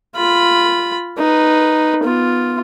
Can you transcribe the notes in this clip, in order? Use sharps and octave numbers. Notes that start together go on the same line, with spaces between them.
F4 B5
D#4 B4
B3 F4